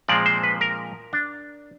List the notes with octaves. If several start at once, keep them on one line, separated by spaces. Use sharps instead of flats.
A#2 F3 G#3 C4 D5
C5
B4
A#4
D4